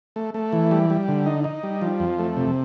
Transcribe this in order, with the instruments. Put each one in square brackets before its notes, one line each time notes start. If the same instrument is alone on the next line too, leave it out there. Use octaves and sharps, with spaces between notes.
[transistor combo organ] A3
A3
E3
G3
G3
D3
D#4
D#4
G3
F3
F2
A3
C3